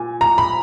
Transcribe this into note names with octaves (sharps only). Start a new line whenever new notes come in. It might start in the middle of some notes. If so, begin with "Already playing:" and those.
Already playing: A#2 G#5
A#5
B5